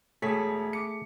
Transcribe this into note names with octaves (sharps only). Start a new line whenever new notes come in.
E1 A3 G#4 A4 C#5 B6
D6 C#7